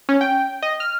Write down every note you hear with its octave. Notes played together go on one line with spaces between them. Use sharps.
C#4
G5
D#5
F6